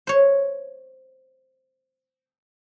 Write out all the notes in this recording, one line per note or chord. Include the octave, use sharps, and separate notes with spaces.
C5 C#5